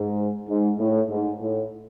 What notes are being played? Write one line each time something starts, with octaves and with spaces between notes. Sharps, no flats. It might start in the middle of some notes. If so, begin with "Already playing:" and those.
Already playing: G#2
G#2
A2
G#2
A2